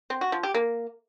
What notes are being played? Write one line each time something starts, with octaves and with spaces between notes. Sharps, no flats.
C4
F#4
F3
G4
A#3